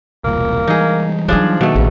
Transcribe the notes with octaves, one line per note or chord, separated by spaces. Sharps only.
E1 C2 A#2 A#3
E3 G3 G#3 D#4 G#4
F3 F#3 D4 D#4 G#4
B2 D#3 A3 A#3
A1 C#3